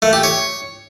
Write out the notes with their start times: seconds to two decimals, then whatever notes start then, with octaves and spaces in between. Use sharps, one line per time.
0.02 A3
0.13 G4
0.23 C#5